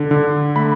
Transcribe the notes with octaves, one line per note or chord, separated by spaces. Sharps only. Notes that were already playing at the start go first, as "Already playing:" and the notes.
Already playing: D3
D3
A3 B5